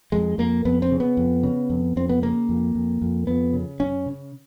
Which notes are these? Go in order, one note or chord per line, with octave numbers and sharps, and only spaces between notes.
F2 G#3
F2 A#3
F2 B3
C4
C#3
B3
F2
C#3
F2
F2 C4
B3
C#3 A#3
F2
F2
F2
F2 B3
C#3
F#2 C#4
C#3